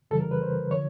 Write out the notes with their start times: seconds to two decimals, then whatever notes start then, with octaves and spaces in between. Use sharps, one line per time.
0.11 F2 C#3 E3 G3 A4
0.21 A#4
0.31 B4
0.42 C5
0.71 D3 F3 C#5